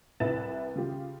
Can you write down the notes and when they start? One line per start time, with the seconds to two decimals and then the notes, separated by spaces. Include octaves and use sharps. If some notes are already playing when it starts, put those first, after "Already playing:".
0.20 C2 E4 B4 A6 E7
0.75 C#3 F4 G4